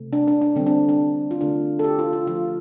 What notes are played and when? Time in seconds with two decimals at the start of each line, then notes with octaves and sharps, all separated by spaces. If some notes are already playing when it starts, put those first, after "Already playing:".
Already playing: C3 A3
0.13 D4
0.28 D4
0.42 D4
0.56 D3 G3 C4
0.66 D4
0.89 D4
1.31 F4
1.41 D3 A3 D4
1.79 A4
1.84 G4
1.99 F4
2.13 F4
2.26 D3 F3 A3 F4